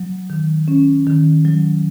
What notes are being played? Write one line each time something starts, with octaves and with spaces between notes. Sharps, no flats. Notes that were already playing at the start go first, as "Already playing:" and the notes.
Already playing: F#3
D#3
C#4
D#3
F#3